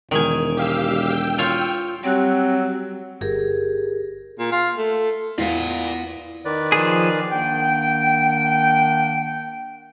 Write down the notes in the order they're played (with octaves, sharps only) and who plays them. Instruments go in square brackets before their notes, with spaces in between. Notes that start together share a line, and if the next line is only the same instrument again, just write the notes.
[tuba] E1 [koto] D#3 G#5
[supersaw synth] G4 F5 E6
G5 E6
[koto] F4 C#5
[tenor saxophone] F#3 [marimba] G3 G4 F#6 [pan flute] C4
[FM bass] G1 [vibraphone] G4 G#4 A#4
[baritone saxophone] A#2
F4
A3
[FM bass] E2 [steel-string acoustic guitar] B3 F4 [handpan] E4 [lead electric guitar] D5 F5
[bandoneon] D#3 B4 D5
[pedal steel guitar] F3 G#4
[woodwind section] D#3 A#3 D4 F#5 G5